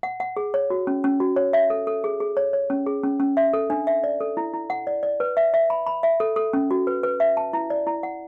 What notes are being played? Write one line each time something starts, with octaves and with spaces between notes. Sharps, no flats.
F#5
F#5
G#4
C#5
F#4
C#4
C#4
F#4
C#5
E5
A4
A4
G#4
G#4
C#5
C#5
C#4
G#4
C#4
C#4
E5
A4
D4
E5
D5
A4
E4
E4
F#5
D5
D5
B4
E5
E5
B5
B5
E5
A4
A4
C#4
F#4
B4
B4
E5
A5
E4
D5
E4
F#5